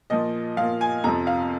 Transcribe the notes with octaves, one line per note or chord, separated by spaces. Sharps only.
A#2 F3 D#5
A#2 F3 F5
G#5
F2 C3 F3 A#5
F5